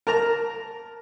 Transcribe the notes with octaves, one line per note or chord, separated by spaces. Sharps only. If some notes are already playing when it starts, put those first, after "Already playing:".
A#4 A5 A#5